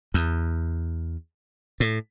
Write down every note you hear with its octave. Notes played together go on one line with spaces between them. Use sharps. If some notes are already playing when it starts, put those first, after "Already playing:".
E2
A2